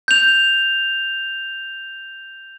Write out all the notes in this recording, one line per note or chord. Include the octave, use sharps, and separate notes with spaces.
G6 F7